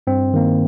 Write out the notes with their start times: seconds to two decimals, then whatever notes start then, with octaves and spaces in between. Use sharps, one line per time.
0.07 G2 C4
0.34 D#3 A#3